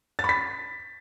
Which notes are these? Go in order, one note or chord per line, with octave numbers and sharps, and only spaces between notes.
A6
B5
B6